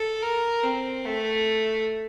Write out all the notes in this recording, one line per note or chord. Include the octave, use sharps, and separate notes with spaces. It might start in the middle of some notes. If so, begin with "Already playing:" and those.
Already playing: A4
A#4
C4
A3